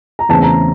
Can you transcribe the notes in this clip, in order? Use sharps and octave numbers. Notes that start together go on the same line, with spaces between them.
A#5
E2 C#3 E3 A3 C4 A5
A#5